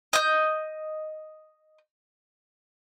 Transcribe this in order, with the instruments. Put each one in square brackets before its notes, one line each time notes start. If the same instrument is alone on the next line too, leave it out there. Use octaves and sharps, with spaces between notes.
[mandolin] D#5 G6